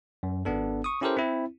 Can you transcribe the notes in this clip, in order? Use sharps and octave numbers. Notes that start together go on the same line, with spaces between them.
F#2
G#1 B3 D4 A4
C#6 D#6
C#4 E4 G4 A4 A#4 C5
C4 E4